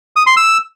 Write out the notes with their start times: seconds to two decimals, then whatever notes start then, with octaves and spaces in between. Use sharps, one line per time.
0.16 D#6
0.27 C6
0.37 E6